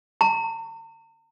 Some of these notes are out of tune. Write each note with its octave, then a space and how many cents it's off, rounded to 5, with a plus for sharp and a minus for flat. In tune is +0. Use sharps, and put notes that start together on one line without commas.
A#5 -40